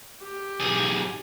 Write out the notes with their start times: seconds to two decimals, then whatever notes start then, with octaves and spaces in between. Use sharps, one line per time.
0.22 G4
0.60 B1 G#4